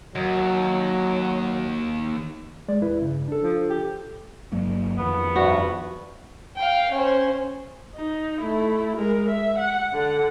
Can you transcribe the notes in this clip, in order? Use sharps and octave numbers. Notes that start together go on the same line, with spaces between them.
D#2 F#3
G#3 D5
E2 E4 B4
G2 C#3
D4 A4
F3
G4
G1 F#3 A#3
F2 D#3 F3 B3
G2 C3 G3 F#4
F5 G5
C#4 C5
D#4
A3 E4
G#3 A#4
E5
F#5
D3 F#5